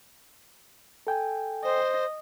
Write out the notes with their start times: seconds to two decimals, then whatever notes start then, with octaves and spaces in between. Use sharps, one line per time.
1.07 A4 G5 G#5
1.64 C5 D#5